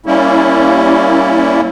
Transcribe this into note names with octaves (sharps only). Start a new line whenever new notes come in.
G3 A#3 C#4 E4